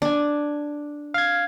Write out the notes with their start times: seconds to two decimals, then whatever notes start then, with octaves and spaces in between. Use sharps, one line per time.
0.02 D4 G#5
1.14 F5 G#6